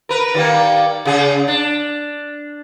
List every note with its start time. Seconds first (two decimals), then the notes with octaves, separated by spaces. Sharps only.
0.09 A#4 B4
0.34 D#3 G3 A#3
1.05 C#3 G#4
1.48 D4